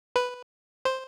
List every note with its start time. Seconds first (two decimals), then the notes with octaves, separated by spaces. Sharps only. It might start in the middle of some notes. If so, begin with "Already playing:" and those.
0.16 B4
0.85 C5